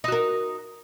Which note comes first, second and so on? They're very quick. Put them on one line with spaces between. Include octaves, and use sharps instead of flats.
D#4 F#4 A#4